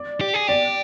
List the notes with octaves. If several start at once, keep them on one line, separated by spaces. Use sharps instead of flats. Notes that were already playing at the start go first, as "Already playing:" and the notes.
Already playing: D5
G4
G#4
G4 D5